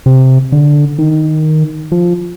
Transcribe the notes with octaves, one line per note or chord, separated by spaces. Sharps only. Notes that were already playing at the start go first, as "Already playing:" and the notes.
C3
D3
D#3
F3